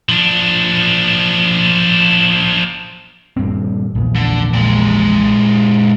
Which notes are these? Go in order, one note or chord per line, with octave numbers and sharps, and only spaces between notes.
F3 D4
D#1 G2 C4
A#1 E2
D3
A#2 G#3